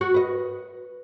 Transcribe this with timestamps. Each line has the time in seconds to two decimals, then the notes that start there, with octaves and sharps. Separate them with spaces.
0.01 F#4
0.14 B4 D#5